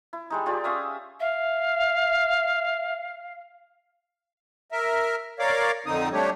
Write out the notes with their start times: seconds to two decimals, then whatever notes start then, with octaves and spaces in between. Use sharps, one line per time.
0.13 E4
0.30 G3 G#3 D#4
0.46 F4 G4 G#4 D5
0.64 C#4 E5 F5 D#6
1.20 E5 F5
4.72 A#4 E5
5.39 A#4 C#5 D5 F5 D6
5.86 F2 D3 C4 D#4 D#6
6.13 G3 A3 D4 G4 C#5